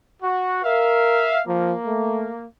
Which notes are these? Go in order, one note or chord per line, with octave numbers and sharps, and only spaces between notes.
F#4
A#4 E5 F5
F3 A#3
A3